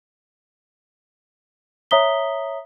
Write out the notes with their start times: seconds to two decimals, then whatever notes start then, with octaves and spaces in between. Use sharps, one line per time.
1.91 C#5 E5 A#5 D#6 B6 G7